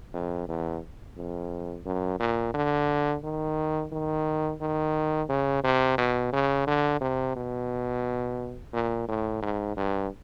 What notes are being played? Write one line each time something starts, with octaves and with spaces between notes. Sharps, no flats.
F2
E2
F2
F#2
A#2
D3
D#3
D#3
D#3
C#3
C3
B2
C#3
D3
C3
B2
A#2
A2
G#2
G2